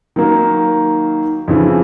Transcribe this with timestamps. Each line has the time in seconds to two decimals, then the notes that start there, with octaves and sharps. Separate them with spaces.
0.16 D#3 F#3 A#3 D#4
1.48 F2 C#3 E3